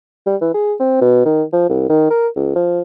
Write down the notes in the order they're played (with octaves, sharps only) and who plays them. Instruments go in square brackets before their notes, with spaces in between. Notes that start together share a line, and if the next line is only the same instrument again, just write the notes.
[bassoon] G3
E3
G#4
C4
B2
D#3
F3
C2
D#3
A#4
C#2
F3